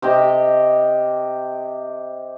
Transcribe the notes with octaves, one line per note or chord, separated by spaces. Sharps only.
C3 G4 D#5